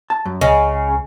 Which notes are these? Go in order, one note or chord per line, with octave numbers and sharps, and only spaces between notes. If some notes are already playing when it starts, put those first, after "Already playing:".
A5
F#2
C#2 C#3 D#5